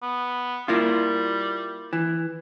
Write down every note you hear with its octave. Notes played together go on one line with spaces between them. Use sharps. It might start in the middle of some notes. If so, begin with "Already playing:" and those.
B3
G3 A#3 E4 F4
E3